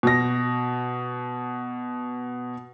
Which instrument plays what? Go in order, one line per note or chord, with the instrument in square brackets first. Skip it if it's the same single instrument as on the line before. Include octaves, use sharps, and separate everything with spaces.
[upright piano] B2 A#6